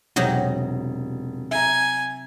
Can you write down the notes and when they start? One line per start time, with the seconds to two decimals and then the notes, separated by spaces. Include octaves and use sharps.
0.16 E1 C3 F#3 D#4
1.51 E5 G#5 A#5